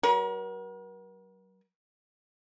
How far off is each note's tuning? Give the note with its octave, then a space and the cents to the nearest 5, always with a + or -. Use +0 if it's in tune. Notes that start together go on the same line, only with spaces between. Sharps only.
F#3 +30 A#4 +45